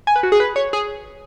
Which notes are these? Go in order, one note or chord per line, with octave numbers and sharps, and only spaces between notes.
G#5
B4
F#4
G#4
B4
C#5
G#4